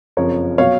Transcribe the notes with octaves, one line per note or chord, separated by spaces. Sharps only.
F#1 F2 F3 A#4 C#5
B2 F#3 C#5 F5